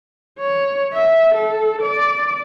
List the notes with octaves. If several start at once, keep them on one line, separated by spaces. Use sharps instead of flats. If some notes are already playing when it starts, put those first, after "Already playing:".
C#5
E5
A4
D5